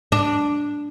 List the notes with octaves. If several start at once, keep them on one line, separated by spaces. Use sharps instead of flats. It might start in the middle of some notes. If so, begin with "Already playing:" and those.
D4